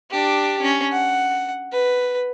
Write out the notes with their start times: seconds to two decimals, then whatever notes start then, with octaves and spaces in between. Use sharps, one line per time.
0.11 D4 G4
0.61 C#4
0.92 F#5
1.73 B4